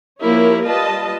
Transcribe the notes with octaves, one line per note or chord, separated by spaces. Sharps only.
F3 A#3 E4 G4 A#4 C#5
G3 F4 B4 D#5 A5